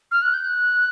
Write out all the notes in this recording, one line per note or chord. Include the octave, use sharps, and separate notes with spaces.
F6
F#6
G6
F#6